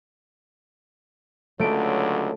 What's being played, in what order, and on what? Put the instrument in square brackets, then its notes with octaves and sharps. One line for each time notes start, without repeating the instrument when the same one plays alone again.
[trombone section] C#2 D3 F#3 [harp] A3 D7